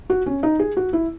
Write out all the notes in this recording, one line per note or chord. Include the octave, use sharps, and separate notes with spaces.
F#4
C#4
D#4
G#4
F#4
E4